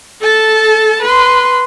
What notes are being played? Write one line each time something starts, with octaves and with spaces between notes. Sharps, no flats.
A4 A5
B4 C6